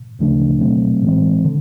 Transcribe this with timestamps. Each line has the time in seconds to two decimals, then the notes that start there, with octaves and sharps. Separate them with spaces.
0.19 D2 C#3 F3 A3 D4
0.61 C#2 B2 F#3 A3 C4
1.02 A2 E3 G#3 C4
1.44 D3